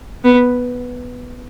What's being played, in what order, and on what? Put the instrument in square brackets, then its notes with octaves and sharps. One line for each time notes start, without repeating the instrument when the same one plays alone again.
[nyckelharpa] B3